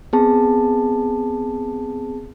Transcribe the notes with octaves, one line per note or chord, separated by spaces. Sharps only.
B3 C4 G#4 A5